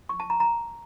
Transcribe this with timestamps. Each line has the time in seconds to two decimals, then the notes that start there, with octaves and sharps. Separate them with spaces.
0.09 C#6
0.20 A5
0.30 A#5
0.40 A#5